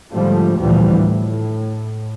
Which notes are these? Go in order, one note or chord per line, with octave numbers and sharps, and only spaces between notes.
G#2 D3 F3 G3 A3
D2 A#2 E3 F3 G3
A2